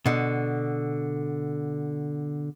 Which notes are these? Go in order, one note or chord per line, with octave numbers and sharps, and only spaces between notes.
B2 D3